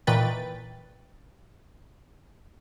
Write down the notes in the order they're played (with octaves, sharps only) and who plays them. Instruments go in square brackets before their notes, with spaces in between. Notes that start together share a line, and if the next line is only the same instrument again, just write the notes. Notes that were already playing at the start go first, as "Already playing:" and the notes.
[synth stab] A#2 D#3 E3 B4 G5 A6